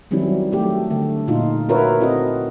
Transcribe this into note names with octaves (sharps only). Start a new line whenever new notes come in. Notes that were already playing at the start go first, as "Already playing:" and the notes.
D#3 F#3 G3 C4 C#4 E4
F#3 A3 G4
D3 A3
A#2 D#4 F4
F4 F#4 A#4 B4 C#5 E5
C4 E4 F#4 A4 D#5